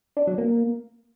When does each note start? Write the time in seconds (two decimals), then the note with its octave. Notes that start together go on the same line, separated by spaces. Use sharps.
0.17 D4
0.27 F#3
0.38 A#3